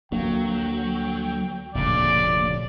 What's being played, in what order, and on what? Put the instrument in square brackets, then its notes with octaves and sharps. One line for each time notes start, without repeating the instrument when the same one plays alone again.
[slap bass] D2 A#3 [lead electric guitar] F#3 [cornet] G5
[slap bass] F1 D2 C#3 [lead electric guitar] A#2 [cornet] D5